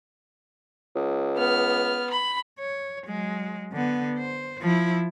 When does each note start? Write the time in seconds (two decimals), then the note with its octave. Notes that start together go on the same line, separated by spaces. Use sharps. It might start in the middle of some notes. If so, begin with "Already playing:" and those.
0.95 C#2
1.36 B3 F6
2.10 B5
2.59 C#5
3.07 F#3 G#3
3.72 D3 B3
4.18 C5
4.61 F3 E4